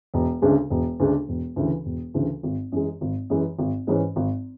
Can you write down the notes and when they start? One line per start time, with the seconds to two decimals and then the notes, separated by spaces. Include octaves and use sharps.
0.14 E1
0.42 D2 C#3 G#3 D4
0.70 E1
1.00 D2 C#3 G#3 D4
1.28 E1
1.56 D2 C#3 E3
1.85 E1
2.14 D2 C#3 E3
2.43 G#1
2.72 F#2 E3 G#3
3.01 G#1
3.30 F#2 E3 G#3
3.59 G#1
3.87 G#2 E3 G#3 C#4
4.16 G#1